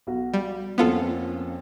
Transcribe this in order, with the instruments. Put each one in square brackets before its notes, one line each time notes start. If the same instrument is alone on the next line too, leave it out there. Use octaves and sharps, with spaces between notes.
[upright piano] B1 F#4 F#5
[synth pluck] G3
[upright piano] F2 A#3 C#4 [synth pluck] B3 F4 A4